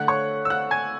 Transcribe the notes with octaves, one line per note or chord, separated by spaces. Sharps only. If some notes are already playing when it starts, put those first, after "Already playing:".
Already playing: D3 A3 F#5 F#6
C#5 C#6
E6
F#5 F#6
G#5 G#6